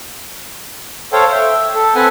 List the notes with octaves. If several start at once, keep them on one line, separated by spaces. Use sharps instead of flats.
A4 C5 C#5 F5 G5
E5 G5
A4
C4 A4 B4 F#5 G#5